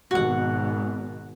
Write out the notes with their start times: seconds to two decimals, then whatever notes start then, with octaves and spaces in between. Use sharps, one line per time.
0.11 G#1 B2 F#4 F#5